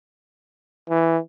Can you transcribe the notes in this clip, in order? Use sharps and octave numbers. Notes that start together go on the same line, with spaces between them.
E3